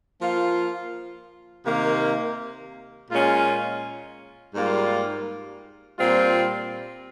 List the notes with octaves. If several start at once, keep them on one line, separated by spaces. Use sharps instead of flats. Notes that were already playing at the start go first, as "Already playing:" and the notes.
F3 A#3 F4
C3 D#3 A#3
A#2 G#3 C#4 F4
G#2 G3 A#3 F4
A#2 G3 C4 F4